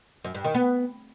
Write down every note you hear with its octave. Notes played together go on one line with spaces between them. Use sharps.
F#2
G2
D#3
B3